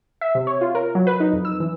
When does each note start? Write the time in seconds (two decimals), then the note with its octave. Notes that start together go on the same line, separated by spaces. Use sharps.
0.21 E5
0.35 C3
0.47 C#5
0.61 F4
0.75 A#4
0.95 F#3
1.07 B4
1.20 D#4
1.33 F2
1.45 E6
1.60 E3